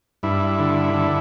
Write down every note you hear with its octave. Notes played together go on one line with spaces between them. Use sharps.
G2 E4
D3
D3